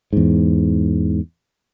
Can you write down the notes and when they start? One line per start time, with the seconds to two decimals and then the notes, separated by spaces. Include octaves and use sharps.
0.13 E2 G#2